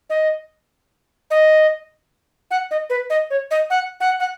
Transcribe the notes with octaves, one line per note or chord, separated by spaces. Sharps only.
D#5
D#5
F#5
D#5
B4
D#5
C#5
D#5
F#5
F#5
F#5